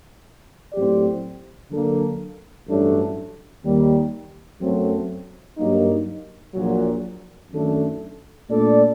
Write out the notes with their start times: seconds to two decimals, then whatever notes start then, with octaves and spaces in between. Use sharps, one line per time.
0.73 A2 F#3 C4 G4 D5
1.69 D3 F#3 A#3 D4 A4
2.67 A1 G2 F#3 A3 D4
3.63 D#2 D#3 G3
4.60 F#2 F#3 A3 C4
5.58 G2 F#3 A#3 D#4
6.54 A#1 A#2 F#3
7.52 F#2 D#3 A3 D4 A4
8.49 A#2 A3 D4 A4 D5